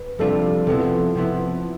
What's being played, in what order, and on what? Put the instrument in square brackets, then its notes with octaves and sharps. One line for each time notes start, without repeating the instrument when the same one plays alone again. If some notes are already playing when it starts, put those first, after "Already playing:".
Already playing: [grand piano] B4
[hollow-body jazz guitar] F2 C3 G3 D4 F4 [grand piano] A4
[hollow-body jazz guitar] C3 F3 B3 E4 [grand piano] A4
[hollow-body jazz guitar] C3 F3 B3 E4